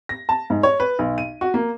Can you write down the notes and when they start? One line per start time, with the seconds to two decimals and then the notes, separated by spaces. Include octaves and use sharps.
0.09 A#6
0.29 A5
0.50 G#2
0.63 C#5
0.80 B4
0.99 B1
1.18 D#7
1.41 F#4
1.54 A#3